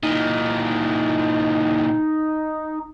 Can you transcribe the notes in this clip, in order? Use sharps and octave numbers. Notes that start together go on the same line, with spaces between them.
A#2 E3 D#4